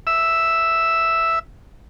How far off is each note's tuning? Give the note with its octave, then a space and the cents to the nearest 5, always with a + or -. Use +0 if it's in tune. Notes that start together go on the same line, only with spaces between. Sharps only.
E5 +0 E6 +0